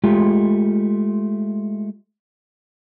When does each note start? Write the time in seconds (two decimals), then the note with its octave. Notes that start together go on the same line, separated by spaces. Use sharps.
0.04 G#3 A3 F4 G4